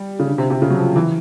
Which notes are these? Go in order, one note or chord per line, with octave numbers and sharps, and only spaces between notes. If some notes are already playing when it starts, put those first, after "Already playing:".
Already playing: G3
C#3
D3
C3
C3
C#3
F#3
F3
E3